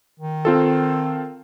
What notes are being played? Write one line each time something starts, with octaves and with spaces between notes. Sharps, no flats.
D#3
C4 F4 A4